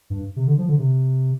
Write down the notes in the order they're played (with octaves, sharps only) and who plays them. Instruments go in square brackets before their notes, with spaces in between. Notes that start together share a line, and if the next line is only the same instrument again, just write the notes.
[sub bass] G2
C3
D3
F3
D3
C3